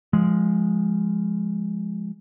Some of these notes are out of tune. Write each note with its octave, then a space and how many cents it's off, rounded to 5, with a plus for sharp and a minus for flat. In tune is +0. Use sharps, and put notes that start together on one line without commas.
F3 +0 G#3 +0